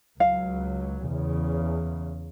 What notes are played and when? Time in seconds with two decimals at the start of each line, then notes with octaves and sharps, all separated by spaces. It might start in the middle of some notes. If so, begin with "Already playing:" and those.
0.20 C#2 F#3 F5
1.08 E2 C#3